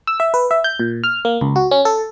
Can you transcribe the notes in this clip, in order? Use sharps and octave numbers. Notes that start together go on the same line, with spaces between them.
E6
E5
B4
E5
G6
A#2
F6
A#3
C#2
F#4
C#4
A4